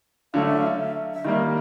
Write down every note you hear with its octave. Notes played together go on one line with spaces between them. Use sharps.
D3 F#3 A3 F5
E5
F5
E5
E5
D#3 G3 A#3 D#5